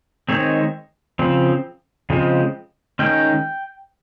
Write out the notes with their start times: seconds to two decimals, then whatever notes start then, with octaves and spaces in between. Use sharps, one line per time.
0.29 D#3 G#3 C4 C#5
1.19 C#3 F3 C4
2.10 C#3 F3 G#3 C4
2.99 D#3 G#3 C#4 G5